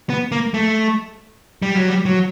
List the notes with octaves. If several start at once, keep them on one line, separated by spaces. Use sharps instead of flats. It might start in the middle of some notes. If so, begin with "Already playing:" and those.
B3
A#3
A3
G3
F#3
G3
F#3